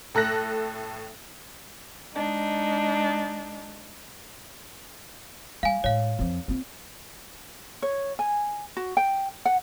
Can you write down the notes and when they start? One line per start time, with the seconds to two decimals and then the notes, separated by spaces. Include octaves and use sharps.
0.15 A2 A4 F#6 A#6
2.14 G#3 D4 D#4
5.63 G3 F5 G#5
5.84 A2 G#3 C#5 F5
6.19 F2 F3
6.48 C4 F4
7.82 C#5
8.19 G#5
8.77 F#4
8.97 G5
9.46 F#5